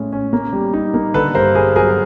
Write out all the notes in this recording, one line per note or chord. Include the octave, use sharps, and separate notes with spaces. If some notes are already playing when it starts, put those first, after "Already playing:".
Already playing: A2 G#3 C#4
C#4
A#3
G3
D#4
A#3
D3 A4 B4
G2 A#4 C5
G2 G#4 A#4
F#3 G#4 A#4